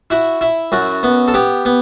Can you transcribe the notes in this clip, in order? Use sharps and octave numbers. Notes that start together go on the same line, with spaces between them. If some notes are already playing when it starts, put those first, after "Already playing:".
E4 F#4
E4
F#2 F#4
B3
A4
B3 G4
B3